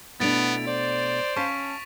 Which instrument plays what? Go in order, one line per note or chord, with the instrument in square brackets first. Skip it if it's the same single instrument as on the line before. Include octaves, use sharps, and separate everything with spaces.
[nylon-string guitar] B2 A3 D4 [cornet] B3 [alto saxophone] E4 [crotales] A6 D7 F7
[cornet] C5 [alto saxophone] D5
[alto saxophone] C#4 [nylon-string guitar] F5 A5 [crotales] C#6 B6